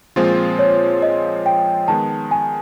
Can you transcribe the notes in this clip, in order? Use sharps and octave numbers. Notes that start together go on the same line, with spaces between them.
A#2 F3 G#3 C4 F4 C5
C#5
D#5
G5
D#3 G#3 B3 A5
G#5